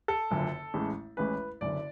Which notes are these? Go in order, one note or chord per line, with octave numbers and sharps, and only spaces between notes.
A4
F#1 F#2 D3 F3
A1 A2 G#3 C#4
A1 A2 G#3 C#4 B4
F#1 F#2 D3 D5